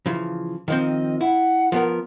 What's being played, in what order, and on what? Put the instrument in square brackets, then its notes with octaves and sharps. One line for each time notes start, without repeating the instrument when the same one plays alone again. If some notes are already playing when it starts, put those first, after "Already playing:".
[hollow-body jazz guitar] C#3 E3 F3
[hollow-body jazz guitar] D#3 F3 C4 [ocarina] D#5
[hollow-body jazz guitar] E4 [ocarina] F#5
[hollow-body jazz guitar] F3 B3 A#4